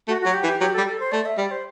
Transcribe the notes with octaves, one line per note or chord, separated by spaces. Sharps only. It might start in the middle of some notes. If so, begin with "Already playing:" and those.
A3 F#4
F#3 F#4
G4
E3
G4
F#3 G4
A4
G3
A4
C5
A3 D5
E5
G3 D5
C5